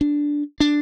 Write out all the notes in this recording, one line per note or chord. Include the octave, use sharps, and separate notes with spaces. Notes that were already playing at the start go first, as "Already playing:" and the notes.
D4
D4